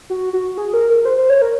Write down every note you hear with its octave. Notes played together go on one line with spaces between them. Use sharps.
F#4
F#4
G#4
A#4
A#4
C5
C5
C#5
A#4